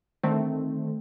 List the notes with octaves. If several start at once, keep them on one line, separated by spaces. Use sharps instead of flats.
D3 D#3 A3 C4